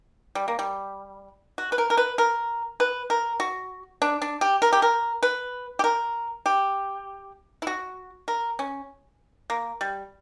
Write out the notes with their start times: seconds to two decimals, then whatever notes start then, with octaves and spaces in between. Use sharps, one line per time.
0.35 G3
0.48 A#3
0.59 G3
1.58 F#4
1.72 B4
1.78 A#4
1.90 A#4
1.97 B4
2.18 A#4
2.80 B4
3.10 A#4
3.40 F#4
4.02 D4
4.22 D4
4.41 G4
4.62 A#4
4.73 G4
4.82 A#4
5.23 B4
5.79 G4
5.84 A#4
6.46 G4
7.62 E4
7.67 F#4
8.28 A#4
8.59 C#4
9.50 A#3
9.81 G3